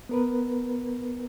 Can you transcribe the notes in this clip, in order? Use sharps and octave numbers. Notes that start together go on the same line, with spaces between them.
B3 A#4 B4